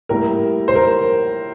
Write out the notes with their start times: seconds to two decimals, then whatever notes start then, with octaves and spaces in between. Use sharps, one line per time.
0.09 A2 G3 A#3 A#4
0.68 C5
0.75 A#4